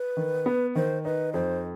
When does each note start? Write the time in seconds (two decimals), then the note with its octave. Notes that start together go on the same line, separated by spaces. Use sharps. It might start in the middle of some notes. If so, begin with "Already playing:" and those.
Already playing: B4
0.17 D#3
0.46 B3
0.75 D#3 C5
1.04 D#4 B4
1.33 F2 C5